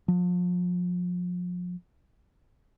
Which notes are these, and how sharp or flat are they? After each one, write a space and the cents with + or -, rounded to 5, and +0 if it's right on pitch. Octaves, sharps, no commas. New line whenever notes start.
F3 +35